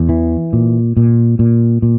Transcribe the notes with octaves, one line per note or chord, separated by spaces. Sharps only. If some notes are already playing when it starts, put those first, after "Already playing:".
Already playing: E2
E3
A#2
A#2
A#2
A#2